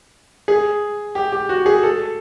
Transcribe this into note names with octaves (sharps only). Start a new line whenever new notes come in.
G#4
G4
G4
F#4
G#4
A4